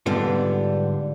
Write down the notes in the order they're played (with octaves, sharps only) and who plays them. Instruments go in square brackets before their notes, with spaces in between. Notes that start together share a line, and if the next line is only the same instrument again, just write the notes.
[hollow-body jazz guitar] G#2 D3 G3 B3 D4 F4